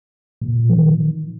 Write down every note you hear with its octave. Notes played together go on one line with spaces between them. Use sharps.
A#2
F3
D#3